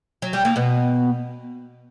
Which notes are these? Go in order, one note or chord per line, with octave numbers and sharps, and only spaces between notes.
F#3
G3
A#3
B2 B3